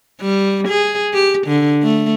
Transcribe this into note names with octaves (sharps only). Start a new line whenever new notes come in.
G3
G#4
G4
D3
A3